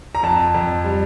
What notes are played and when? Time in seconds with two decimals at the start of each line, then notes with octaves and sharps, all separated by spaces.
0.15 A#5
0.23 F2 A5
0.54 F2
0.84 G3